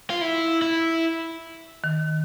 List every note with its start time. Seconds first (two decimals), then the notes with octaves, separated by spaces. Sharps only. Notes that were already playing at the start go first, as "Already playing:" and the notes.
0.10 F4
0.21 E4
0.62 E4
1.84 D#3